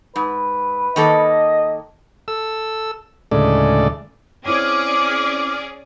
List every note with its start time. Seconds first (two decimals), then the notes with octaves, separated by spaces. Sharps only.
0.16 G#2 B4
0.96 D#3 A#3 A4 D#5
2.28 A4 E6
3.31 D2 A2 C#3 G#3 A4 D5
4.45 C4 C#4 E4 G#4 C#5 D5 D6 F6